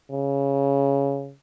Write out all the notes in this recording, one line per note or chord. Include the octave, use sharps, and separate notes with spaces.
C#3